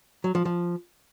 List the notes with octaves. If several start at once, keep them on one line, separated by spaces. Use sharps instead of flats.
F#3
F3
F3